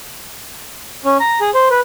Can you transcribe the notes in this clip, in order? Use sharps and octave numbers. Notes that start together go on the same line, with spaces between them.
C#4
A#5
G#4
C5
B4